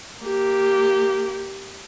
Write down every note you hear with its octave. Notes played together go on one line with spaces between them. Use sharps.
A#3 G4